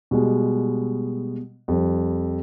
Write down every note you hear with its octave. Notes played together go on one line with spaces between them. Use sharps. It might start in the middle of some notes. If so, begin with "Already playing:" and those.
B2 G3 G#3
F2 G3